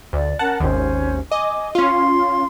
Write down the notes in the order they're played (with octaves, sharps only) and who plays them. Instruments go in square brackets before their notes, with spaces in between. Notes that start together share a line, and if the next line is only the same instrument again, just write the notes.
[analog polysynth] D2 [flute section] D5
[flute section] C#4 A#4 [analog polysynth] F#5 A5
[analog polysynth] G#1 D#2 [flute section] C#4 C5
[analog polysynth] D#5 [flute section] G#5 D6
[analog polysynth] C#4 F4 [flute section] C6